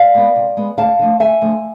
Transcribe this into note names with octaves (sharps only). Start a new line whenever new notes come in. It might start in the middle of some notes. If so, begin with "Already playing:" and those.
Already playing: D5 F5
G#3 B3
C3
G#3 B3
D2 F5 A5
D3 F3 A3
D2 E5 G#5
D3 F3 A3